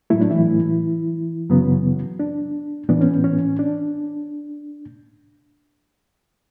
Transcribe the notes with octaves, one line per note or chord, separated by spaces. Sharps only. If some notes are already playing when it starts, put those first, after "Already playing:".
A2 F#3 A3 E4
D4
E3 E4
F#2 C#3 F#3 B3
D4
A2 E3 B3 D4
C#4
C#4
D4